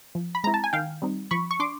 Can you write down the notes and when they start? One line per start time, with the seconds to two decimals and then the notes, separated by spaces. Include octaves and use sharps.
0.15 F3
0.35 B5
0.44 G#3 C4 E4 A#5
0.54 A5
0.64 G#5
0.73 D#3 F5 G5
1.02 G3 C4 D#4
1.31 F3 B5 C#6
1.51 C#6
1.60 D4 C6 D6